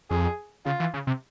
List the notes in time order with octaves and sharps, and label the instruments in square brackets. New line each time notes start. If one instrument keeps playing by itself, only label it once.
[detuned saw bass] F2 [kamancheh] G#4
[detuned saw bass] C#3 [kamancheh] F4
[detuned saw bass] E3
C#3
C3